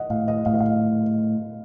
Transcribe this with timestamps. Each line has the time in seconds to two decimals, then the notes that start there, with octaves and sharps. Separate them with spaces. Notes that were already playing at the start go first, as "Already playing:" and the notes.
Already playing: D#5 F#5
0.10 A2 F5
0.28 D#5
0.46 A2 F5
0.54 D#5
0.60 F5